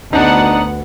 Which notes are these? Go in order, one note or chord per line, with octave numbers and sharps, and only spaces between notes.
D2 B3 D4 D#4 F#5